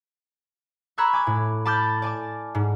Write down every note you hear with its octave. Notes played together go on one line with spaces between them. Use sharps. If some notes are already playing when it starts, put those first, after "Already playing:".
A#5 B5 C#6 E6 F#6 G#6
G#5 D6 G#6
A2
A5 B5 D6 F6 G6 A6
D5 G#5 A5 D6
G#2